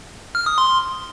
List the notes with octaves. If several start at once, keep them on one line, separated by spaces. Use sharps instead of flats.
F6
D#6
C6